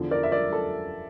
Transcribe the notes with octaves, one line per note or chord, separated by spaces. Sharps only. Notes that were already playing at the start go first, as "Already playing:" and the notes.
Already playing: E2 D3 F3
A#4 D5
E5
A#4 D5
A4